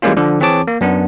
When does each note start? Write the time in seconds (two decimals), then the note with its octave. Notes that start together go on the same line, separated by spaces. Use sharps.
0.02 E3 G3 G#3 A#3 C#4 F4
0.17 D3 F3 D4
0.40 E3 C4 G#4 C#5 A5 D6
0.68 A#3
0.81 F#2 B3 D4